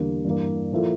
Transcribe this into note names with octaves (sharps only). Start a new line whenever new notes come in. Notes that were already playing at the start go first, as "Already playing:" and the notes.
Already playing: E2 D3 G3 A#3
G2 E3 A#3
A#2 F3 A#3 E4 A4